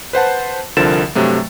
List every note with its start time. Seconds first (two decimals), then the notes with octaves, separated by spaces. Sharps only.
0.13 B4 C5 F#5 A5
0.77 C2 D3 F3 A#4 A6 E7
1.15 G2 C3 F#3 A3